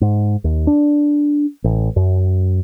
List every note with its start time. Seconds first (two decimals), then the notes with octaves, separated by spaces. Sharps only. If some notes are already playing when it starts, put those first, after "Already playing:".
0.01 G#2
0.44 D#2
0.67 D4
1.64 A1
1.96 F#2